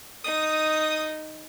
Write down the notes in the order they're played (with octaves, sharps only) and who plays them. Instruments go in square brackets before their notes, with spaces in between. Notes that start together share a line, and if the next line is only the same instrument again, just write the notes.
[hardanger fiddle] D#4 [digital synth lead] D#6